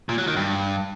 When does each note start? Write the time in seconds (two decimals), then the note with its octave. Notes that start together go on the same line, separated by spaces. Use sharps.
0.09 A#2
0.18 F#3
0.27 D#3
0.37 G2